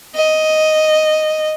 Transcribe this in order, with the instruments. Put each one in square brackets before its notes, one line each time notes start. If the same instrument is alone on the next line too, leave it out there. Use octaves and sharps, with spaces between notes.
[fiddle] D#5